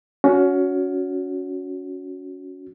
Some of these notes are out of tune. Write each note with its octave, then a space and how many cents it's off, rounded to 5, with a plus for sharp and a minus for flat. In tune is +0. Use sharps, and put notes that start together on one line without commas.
C#4 +20 F#4 -10